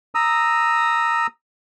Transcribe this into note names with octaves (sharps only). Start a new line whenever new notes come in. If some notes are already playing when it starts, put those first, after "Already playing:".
A#5 D#6 E6